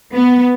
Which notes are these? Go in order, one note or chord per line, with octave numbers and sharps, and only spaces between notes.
B3